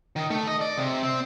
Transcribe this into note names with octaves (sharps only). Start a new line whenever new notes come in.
D#3
A3
D#5
D5
C3
C4